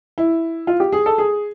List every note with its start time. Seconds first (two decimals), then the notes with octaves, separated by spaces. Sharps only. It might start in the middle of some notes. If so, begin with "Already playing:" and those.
0.18 E4
0.67 F4
0.80 G4
0.93 G#4
1.06 A4
1.18 G#4